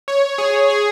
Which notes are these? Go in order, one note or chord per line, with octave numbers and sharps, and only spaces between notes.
C#5
G#4
G#4